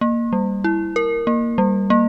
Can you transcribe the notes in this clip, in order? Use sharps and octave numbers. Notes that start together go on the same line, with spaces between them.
A#3
G3
E4
A#4
A#3
G3
A#3